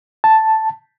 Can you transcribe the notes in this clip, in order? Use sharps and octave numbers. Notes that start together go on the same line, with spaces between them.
A5